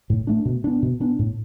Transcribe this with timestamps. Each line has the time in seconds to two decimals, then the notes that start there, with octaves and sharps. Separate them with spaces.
0.10 A2
0.27 A3 D4
0.45 B2
0.64 B3 D4
0.82 B2
1.00 B3 D4
1.19 A2